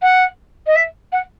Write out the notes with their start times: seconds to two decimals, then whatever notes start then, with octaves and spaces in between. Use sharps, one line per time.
0.02 F#5
0.66 D#5
0.75 E5
1.12 F#5